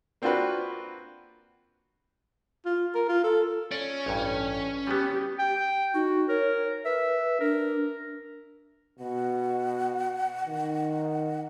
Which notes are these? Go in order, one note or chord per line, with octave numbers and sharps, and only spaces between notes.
A#3 C4 D4 F4 F#4 B4
F4
A#4
F4
A4
C#4 D5
A1 G2
G3 B3 G4
G5
D#4 F#4
A#4 C#5
B4 E5
D4 A#4
B2 F#5
D#3